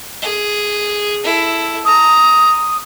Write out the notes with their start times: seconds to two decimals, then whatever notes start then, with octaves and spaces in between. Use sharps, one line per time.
0.22 G#4
1.24 E4 A4
1.85 A#5 D#6